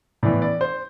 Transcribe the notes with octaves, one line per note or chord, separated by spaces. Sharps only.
A2 E3 B3 D5
D5
C5